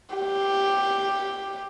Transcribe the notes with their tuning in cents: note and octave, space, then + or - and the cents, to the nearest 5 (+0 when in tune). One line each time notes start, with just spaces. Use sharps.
G4 +5